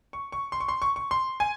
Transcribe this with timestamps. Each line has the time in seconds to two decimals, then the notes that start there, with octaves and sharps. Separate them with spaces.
0.13 C#6
0.32 C#6
0.52 C6
0.60 C#6
0.68 C6
0.82 C#6
0.96 C#6
1.11 C6
1.40 G#5